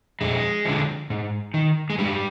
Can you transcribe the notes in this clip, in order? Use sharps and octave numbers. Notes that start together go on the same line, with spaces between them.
F2 G#3
D3 F3
G#2
D#3
G#3
G#2 G3